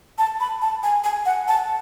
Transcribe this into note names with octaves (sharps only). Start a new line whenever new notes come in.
A5
B5
A5
G#5
G#5
F#5
A5